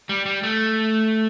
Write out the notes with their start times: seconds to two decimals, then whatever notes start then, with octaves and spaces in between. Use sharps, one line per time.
0.09 G3
0.26 G3
0.43 A3